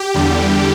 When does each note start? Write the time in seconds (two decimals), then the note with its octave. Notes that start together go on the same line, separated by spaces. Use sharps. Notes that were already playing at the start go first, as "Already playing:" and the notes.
Already playing: G4
0.14 E2 D3 G3